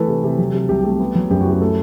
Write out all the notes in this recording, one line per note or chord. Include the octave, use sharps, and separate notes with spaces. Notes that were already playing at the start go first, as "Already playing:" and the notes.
Already playing: E3 A3 A4 B4
C3
C3
F#3
C3
C2 G4
A3 G4
B3
F#3
F#2 G4
E4 F#4
G4
A3 A4